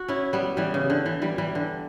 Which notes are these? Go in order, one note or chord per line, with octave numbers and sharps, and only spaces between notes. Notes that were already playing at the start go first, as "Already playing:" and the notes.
Already playing: F#4
C#4 E4
G3 B3
E3 G3
C#3
D3
E3
E3 G3
E3 G3
D3